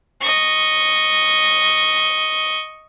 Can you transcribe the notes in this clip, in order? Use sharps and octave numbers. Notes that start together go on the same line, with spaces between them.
D#5 C#6